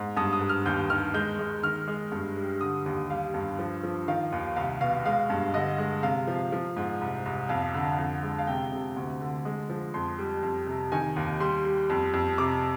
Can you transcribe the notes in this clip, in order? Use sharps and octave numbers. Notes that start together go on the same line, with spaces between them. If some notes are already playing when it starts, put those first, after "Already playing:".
Already playing: G#2
G2 D#6
D#6
G2
F6
D#2 G6
D#3 F6
G#3 G6
G#3
D#3 F6
G#3
G2
G3
D3 D#6
D#2
G3 F5
G2
F3
F3
D#3 F5
D#2
C2 F5
B2 F5
G#3 F5
G2
D3 D#5
G#3
C3 F5
F3
F3
G#2
C2
C2
F2 F5
D3
F2
G#3
F5
C3 G5
C3
D2
D3
G#3
F3
F2 C6
G3
F2
C3
D#3 G#5
D#2
G3 C6
G3
F2
F2
C3 D6